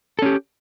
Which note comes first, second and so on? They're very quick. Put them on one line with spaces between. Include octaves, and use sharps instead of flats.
A4 C#4 G4